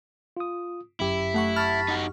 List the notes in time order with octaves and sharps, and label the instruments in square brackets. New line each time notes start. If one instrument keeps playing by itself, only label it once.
[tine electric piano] F4 D#6
[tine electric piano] G1 F#2 G4 [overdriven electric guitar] E4
[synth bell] A3 F#5 C#6
[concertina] A5 B5 [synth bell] C#6 F6
[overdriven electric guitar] D#4 F#4